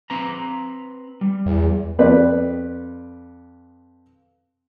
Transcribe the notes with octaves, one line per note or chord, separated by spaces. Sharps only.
C4 B4 A#5
G3
E2
F2 B4 D5